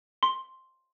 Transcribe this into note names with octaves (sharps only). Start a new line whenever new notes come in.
C6